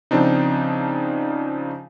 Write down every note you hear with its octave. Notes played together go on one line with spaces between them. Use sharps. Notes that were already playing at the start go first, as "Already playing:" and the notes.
C#3 F3 C4 D4 D#4